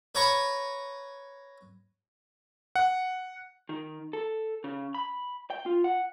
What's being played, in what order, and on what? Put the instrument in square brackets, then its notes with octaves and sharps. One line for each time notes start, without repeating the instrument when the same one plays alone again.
[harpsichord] B4 C#5 A#5 B5 C#6
[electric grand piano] F#5
[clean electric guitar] D#3
A4
C#3
B5
G5
F4
F#5